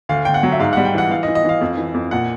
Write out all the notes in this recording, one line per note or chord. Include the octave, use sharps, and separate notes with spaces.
D2 F5
D2 G5
F#5
F#3
E5
G#2 F5
G3 F#5
G5
E3 F#5
E3 F5
D#5
E3
D#5
E3 F5
F2
E3
F2
A#2 F#5